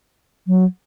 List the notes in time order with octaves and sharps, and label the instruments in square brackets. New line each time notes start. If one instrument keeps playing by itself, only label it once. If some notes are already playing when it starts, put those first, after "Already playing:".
[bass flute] F#3